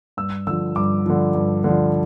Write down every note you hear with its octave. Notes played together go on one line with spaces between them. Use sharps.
G2 E6
D3 F3 E6
G2 D6
D3 F3
G2
D3 F3